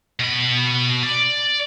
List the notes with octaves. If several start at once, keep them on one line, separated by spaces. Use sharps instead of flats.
B2 B5
D5